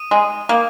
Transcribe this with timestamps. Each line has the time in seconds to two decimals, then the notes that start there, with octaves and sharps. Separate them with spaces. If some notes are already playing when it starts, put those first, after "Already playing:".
Already playing: D#6 D#7
0.11 G#3
0.49 A#3